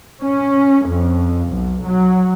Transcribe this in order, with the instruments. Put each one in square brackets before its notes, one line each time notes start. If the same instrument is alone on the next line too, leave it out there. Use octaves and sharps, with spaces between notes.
[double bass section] C#4
F2
B1
F#3